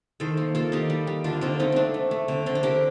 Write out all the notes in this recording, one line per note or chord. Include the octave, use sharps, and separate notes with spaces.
D#3 A4 C5
A#3
A#3 F4 A4
D#3 D#4 G4
G3
G3
D3 D4 F4
D3 C4 D#4
A3 C4 D#4
A3 C4 D4
A3
A3
D3 C4
D3 C4
D4
D3 G4 A#4